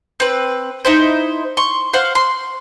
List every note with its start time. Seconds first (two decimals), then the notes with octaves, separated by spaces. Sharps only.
0.20 C4 B4
0.85 D#4 E4 C5
1.57 C6 C#6
1.93 C5 F5 F#5
2.15 C6